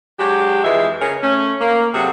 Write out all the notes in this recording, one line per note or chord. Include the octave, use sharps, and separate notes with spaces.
F#3 G#3 D4 G4
F2 E3 G#3 F4 G#4 E5
C#3 C#4 G#4 A#4
A3 C#4
A#3
C3 F#3 F#4 G#4 A4